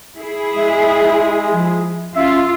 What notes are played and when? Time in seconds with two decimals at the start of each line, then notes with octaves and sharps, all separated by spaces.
0.17 E4 G#4
0.57 G#3 E5
1.52 F3
2.16 C#4 F4 E5